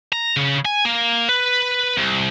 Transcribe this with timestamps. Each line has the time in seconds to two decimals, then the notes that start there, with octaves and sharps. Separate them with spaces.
0.12 A#5
0.37 C#3
0.65 G#5
0.85 A#3
1.29 B4
1.97 C2